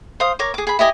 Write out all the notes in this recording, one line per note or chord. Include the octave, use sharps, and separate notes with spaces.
C5 F5 D#6
A#4 C#5 D6
G#4 D6
G#4 B5
E4 G4 D#5 G#5